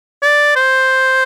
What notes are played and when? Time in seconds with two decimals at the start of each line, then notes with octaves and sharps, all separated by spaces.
0.22 D5
0.56 C5